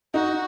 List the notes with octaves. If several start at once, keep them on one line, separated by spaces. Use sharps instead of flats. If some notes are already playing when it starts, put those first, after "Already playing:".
D#4 F#4